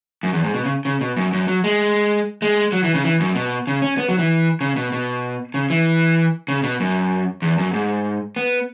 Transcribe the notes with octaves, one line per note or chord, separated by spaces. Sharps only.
F#2
E2
G#2
B2
C#3
C#3
B2
F#2
F#2
F#3
G#3
G#3
F#3
E3
C#3
E3
F#2
B2
C#3
C#4
B3
F#3
E3
C#3
B2
B2
C#3
E3
C#3
B2
F#2
E2
F#2
G#2
B3